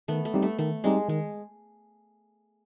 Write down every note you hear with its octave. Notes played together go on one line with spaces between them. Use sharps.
D#3 A3 B3
A3
G3 C4 D#4 G4
A3
D#3 A3
G3 G#3 C4 D#4 G4
D#3 G#3